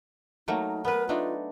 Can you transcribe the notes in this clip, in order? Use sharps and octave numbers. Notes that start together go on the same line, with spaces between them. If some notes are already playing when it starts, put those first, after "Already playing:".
F#3 A3 A#3 D#4
B3 A#4 B4
A3 D4 D#4 F4